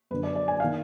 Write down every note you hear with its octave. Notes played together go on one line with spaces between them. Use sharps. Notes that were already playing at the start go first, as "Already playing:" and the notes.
F#2 D3 B4
D5
D5
G#5
F5
D#3